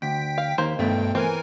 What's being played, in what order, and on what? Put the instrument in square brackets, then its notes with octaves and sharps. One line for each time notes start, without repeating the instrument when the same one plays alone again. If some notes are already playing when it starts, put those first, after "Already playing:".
[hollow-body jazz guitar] D2 [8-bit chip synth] G5 B6
[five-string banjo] F5
[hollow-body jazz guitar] D#2 [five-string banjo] A#3 C5
[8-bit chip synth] G2 G5 [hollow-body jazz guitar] B2 A3
[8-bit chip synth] E3 A#4 G#5 [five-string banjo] C4